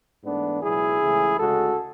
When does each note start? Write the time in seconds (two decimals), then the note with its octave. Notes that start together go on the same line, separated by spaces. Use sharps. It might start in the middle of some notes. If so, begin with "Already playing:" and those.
0.24 G#2 E3 A3 B3 D4
0.61 C#2 B2 F#3 E4 G#4
1.00 C#2 C#3 E3 A3
1.37 D2 C#3 G#3 F#4 A4